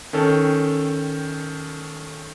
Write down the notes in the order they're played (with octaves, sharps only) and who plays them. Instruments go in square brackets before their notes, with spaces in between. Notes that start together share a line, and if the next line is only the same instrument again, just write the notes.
[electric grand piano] D#3 C#4 A4 G5